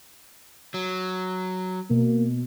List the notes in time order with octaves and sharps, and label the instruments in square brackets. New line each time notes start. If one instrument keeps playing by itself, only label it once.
[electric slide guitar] F#3
[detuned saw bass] B2 [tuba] A#3